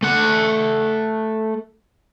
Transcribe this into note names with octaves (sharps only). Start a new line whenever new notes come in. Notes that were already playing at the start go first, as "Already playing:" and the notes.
A3 F#5